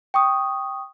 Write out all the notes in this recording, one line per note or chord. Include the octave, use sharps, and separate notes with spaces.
G5 C#6 D#6